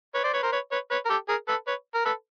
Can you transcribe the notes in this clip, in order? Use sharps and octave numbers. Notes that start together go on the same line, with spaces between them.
B4 C#5
C5 D5
B4 C#5
A#4 C5
B4 C#5
B4 C#5
B4 C#5
A#4
G4 A4
G#4 A#4
A4 B4
B4 C#5
A#4
A4 B4